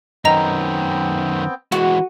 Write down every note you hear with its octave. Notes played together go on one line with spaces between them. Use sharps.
F#2 D#3 B3 C4 D#5 G5 A#5 F7
E3 G#3 F#4